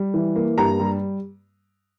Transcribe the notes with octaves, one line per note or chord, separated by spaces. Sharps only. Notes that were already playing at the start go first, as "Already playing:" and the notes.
Already playing: G3
E3
A#3
G2 A#5
G3